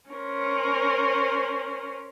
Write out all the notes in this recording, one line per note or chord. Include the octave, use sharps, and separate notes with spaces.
C#4 A#4 C5